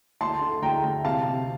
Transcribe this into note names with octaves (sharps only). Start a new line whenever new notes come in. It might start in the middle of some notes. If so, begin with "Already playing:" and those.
D2 A5 C6
D3
D2 G5 A#5
D2
C3 F5 A5
C3